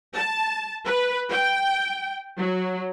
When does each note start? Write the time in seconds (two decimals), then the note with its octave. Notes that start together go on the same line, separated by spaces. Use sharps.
0.14 A5
0.86 B4
1.31 G5
2.38 F#3